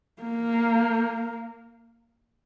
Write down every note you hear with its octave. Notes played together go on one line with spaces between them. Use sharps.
A#3